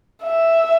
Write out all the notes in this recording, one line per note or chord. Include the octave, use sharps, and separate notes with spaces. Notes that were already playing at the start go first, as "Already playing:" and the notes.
E5